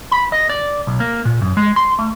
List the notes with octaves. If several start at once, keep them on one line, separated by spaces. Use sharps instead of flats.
B5
D#5
D5
B1
A#3
A#2
F#2
G#3
C6
A3